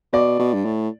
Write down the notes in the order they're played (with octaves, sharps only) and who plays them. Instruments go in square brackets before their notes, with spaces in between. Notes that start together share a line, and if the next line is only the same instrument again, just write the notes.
[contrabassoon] B2 [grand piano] D5
[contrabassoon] B2
G2
A2